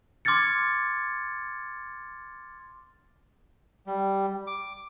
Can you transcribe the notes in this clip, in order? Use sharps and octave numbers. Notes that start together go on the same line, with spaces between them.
C6 D6 F6 G#6 A6 C#7
G3
D6